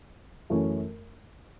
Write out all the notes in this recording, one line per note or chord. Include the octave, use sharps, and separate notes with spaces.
F#2 E3 A3 C#4